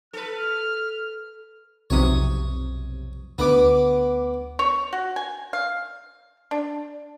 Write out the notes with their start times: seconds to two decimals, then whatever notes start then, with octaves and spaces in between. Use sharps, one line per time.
0.13 A4 B4 F6
1.90 B1 F2 C3 C#5 D#6
3.38 D2 B3 B4 D6
4.59 C#5
4.93 F#4
5.16 G#5
5.53 F5
6.51 D4